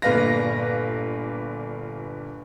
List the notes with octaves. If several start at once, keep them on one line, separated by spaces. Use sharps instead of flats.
G1 A#2 B4 F5 A#6